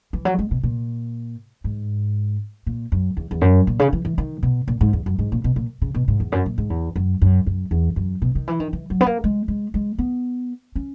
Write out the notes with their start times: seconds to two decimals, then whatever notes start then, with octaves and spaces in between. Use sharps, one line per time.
0.13 E3
0.25 F#3
0.39 G#3
0.51 B2
0.63 A#2
1.64 G#2
2.66 A#2
2.92 F#2
3.17 E2
3.31 E2
3.41 F#2
3.67 A#2
3.79 C#3
3.93 E3
4.05 E3
4.18 D#3
4.43 B2
4.68 A#2
4.81 G#2
4.93 E2
5.06 F#2
5.19 G#2
5.32 A#2
5.44 B2
5.56 A#2
5.82 C#3
5.95 B2
6.08 G#2
6.20 E2
6.32 F#2
6.46 A#2
6.58 G#2
6.70 E2
6.96 F#2
7.22 F#2
7.47 F#2
7.71 E2
7.96 F#2
8.22 B2
8.35 D#3
8.48 E3
8.60 D#3
8.73 E3
8.90 F#3
9.01 B3
9.06 A#3
9.24 G#3
9.48 G#3
9.74 G#3
9.98 B3
10.76 C#4